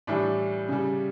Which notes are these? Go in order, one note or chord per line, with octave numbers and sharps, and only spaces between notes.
A2 E3 G3 D4
C#3 G3